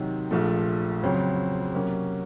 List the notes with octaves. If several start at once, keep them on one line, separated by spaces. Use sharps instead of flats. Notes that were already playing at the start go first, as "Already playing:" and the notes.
Already playing: C3 D#3 F#3
A#1 A#2 F3 A3
F2 C#3 F#3 C4
C3 F#3 A#3 C#4